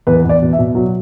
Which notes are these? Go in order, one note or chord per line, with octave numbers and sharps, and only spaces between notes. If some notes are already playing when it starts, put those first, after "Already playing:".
E2 B4
E2 D5
B2
E5
B2
F#3